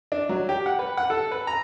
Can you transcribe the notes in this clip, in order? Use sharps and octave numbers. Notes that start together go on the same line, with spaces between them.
D4
F#3
G4
F#5
B4
F#5
A4
B4
A#5